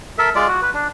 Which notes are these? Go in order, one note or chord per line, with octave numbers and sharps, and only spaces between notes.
A4 A#4 E5
G#3 F4 D5
F#4
B4
D4